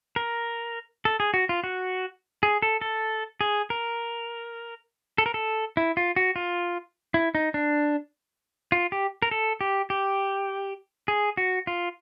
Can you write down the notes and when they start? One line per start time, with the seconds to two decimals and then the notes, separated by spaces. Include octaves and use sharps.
0.16 A#4
1.05 A4
1.20 G#4
1.34 F#4
1.49 F4
1.64 F#4
2.43 G#4
2.62 A4
2.81 A4
3.41 G#4
3.70 A#4
5.18 A4
5.26 A#4
5.34 A4
5.77 E4
5.97 F4
6.16 F#4
6.36 F4
7.14 E4
7.35 D#4
7.54 D4
8.72 F4
8.92 G4
9.22 A#4
9.31 A4
9.61 G4
9.90 G4
11.08 G#4
11.37 F#4
11.67 F4